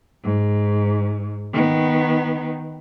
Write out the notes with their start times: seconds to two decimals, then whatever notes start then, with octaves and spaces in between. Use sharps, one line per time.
0.23 G#2
1.53 D#3 B3